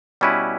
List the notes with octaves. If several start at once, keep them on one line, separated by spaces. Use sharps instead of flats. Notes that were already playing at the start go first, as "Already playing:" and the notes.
B2 G3 C#4 E4 B4